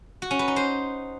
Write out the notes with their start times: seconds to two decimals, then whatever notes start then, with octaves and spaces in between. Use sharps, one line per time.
0.22 F#4
0.31 C#4
0.39 B4
0.48 D#4
0.56 C5